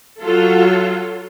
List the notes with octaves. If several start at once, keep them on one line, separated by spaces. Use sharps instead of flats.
F#3 F4 A4